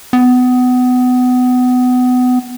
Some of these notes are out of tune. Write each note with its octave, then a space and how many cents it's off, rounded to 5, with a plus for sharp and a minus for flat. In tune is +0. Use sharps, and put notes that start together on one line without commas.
B3 +25